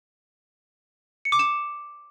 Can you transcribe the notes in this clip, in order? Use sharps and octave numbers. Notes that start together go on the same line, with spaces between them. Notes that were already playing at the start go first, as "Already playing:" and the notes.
C#7
D6
E7